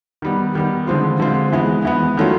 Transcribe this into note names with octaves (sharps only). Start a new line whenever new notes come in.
D#3 G3 B3
D#3 G3 B3
D3 F3 G#3 C4 F4
D3 F3 G#3 C4 F4
E3 G#3 B3
E3 G#3 B3
D#3 F#3 A3 C#4 F4